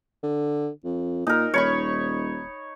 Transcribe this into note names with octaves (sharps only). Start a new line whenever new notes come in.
D3
F2
A#2 D#4 A#4
D#1 C#5 B5 C#6